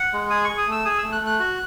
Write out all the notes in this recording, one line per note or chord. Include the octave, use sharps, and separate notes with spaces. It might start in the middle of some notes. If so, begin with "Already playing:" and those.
Already playing: F#5
G#3
G#4 D#6
G#4 C#6
D#6
A3
E6
G#4 D#6
A3 E6
F#6
A3
F#6
F#4